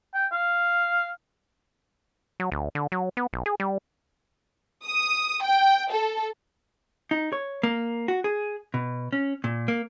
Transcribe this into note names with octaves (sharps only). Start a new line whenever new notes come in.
G5
F5
F#3
D2
D3
F#3
B3
B1
G#4
G3
D#6
G5
A4
D#4
C#5
A#3
F#4
G#4
B2
C#4
A#2
A#3